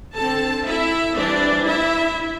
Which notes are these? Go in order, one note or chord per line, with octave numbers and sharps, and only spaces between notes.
D3 C4 A4 A5
E4 E5
E3 G3 C4 D4 D5
E4 E5